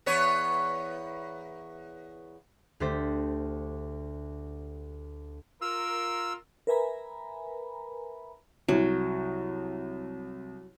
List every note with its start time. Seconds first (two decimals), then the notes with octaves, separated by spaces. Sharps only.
0.06 E2 B3 C#5
2.80 D2 A3 G4 C5 A6 B6
5.62 F4 A#4 E6
6.67 A#4 B4 E5 G#5 A#5 B5
8.69 C2 F#3